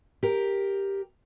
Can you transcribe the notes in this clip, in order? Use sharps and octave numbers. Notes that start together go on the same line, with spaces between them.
G4 A#4